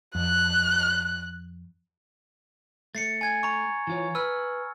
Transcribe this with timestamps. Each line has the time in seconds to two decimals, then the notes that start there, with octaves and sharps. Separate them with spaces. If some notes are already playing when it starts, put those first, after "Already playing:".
0.15 F2 F#6
2.95 A3 A6 C7 C#7
3.21 G#5 G#6
3.43 A#5 C#6
3.87 E3 F4 C#5
4.15 B4 E6 F6